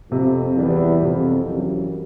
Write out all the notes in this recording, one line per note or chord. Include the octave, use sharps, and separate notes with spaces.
F2 C3
E2 E3 G3
F2 C3
F#2 E3 G3